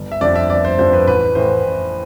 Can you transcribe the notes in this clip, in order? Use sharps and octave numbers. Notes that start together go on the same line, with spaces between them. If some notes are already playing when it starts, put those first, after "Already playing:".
Already playing: G1
E5
F2 D3 F3 D5
E5
G1 D5
C5
F2 D3 F3 C5
B4
A1 B4
A2 E3 C5
A1